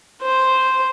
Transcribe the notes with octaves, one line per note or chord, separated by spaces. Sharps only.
C5